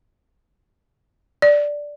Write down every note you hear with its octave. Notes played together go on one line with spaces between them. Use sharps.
D5